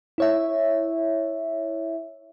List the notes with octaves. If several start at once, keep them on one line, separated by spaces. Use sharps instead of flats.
E4 C#5 E5